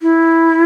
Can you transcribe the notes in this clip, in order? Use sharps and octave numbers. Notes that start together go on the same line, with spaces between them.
E4